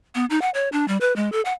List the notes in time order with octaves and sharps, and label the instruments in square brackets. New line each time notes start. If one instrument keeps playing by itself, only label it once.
[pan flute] B3
D#4
F#5
C#5
D4
G3
B4
G#3
A4
F#5